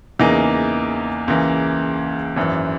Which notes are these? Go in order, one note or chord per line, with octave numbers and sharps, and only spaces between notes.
E2 C#3 E3 A#3 D#4
C#2 C#3 E3 A#3
G#1 F#2 E3